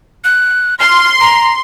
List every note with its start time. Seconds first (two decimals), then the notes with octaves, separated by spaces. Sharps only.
0.24 F#6
0.80 C6 F6
1.20 A#5